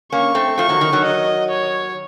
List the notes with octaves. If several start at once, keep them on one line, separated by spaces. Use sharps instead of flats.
A#3 C#4 C#6
A3 C4
F3 A3 C#6
D#3 F#3
D#3
D#3 F#3
D#5
C#5